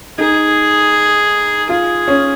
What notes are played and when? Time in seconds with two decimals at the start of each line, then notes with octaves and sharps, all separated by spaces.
0.18 D#4 G#4
1.69 F4 G#4
2.08 C#4